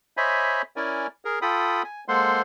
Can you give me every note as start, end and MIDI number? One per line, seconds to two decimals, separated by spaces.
0.17 0.62 72
0.17 0.62 73
0.17 0.62 75
0.17 0.62 76
0.17 0.62 80
0.17 0.62 83
0.76 1.07 61
0.76 1.07 64
0.76 1.07 70
0.76 1.07 74
0.76 1.07 80
1.25 1.39 68
1.25 1.39 70
1.42 1.83 65
1.42 1.83 69
1.42 1.83 79
1.42 1.83 83
1.42 1.83 87
1.84 2.04 80
2.08 2.42 56
2.08 2.42 58
2.08 2.42 69
2.08 2.42 72
2.08 2.42 78
2.08 2.42 84